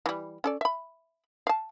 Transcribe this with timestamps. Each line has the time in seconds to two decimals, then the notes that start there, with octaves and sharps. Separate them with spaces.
0.06 E3 G3
0.44 C#4 A4 D5
0.61 E5 B5
1.47 F5 A5